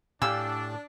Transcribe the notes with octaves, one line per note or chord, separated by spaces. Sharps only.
A2 D4 G4 F5 G#5 E6